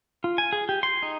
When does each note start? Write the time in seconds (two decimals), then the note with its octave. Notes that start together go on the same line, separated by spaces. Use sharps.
0.24 F4
0.38 G#5
0.53 G#4
0.69 G4
0.83 C6
1.03 D#4